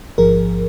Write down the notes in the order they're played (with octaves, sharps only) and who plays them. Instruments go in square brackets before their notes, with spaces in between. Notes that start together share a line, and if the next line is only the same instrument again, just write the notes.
[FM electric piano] A1 G#2 F3 G#4 A#4